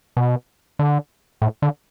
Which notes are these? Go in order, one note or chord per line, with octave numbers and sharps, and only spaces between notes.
B2
D3
A2
D3